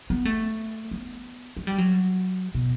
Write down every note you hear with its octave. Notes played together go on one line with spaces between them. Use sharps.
B3
A3
B3
A3
G3
F#3
B2